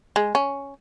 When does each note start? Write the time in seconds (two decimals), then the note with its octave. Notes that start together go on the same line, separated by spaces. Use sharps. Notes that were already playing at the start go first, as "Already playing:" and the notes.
0.16 G#3
0.35 C#4